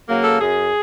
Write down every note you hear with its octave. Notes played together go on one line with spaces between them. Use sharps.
C#3 F#3 A#3
A4
F#2 G#4